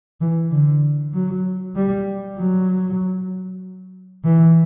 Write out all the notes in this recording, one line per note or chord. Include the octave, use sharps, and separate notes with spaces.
E3
D3
F#3
G3
F#3
E3